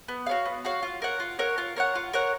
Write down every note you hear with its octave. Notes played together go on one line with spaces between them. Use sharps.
B3
F#4 C#5 F5
B3
F#4 C#5 F5
F4
A#4 C#5 F#5
F4
A#4 C#5 F#5
F4
A#4 C#5 F#5
F4
A#4 C#5 F#5